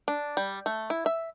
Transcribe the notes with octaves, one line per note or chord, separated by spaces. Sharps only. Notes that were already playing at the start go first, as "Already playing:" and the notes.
D4
G3
A3
E4
E5